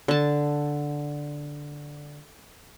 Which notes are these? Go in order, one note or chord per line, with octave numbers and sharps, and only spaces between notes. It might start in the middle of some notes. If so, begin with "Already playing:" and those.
D3 A5